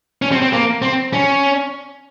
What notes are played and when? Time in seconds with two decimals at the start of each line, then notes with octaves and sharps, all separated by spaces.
0.22 C#4
0.32 C4
0.42 C4
0.53 A#3
0.82 C4
1.13 C#4